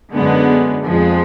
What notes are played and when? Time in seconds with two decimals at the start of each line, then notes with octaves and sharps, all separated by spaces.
0.14 F#2 D3 G#3 B3
0.85 F2 F3 G#3